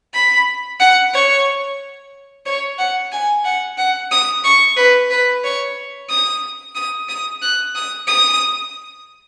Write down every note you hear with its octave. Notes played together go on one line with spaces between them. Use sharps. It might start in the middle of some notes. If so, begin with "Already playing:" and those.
B5
F#5
C#5
C#5
F#5
G#5
F#5
F#5
D#6
C#6
B4
B4
C#5
D#6
D#6
D#6
F#6
D#6
D#6